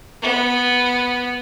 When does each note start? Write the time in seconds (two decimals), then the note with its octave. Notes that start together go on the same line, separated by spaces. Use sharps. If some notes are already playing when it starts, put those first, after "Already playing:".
0.22 B3